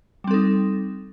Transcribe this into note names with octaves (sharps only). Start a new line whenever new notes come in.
G3 C4 D#4 A4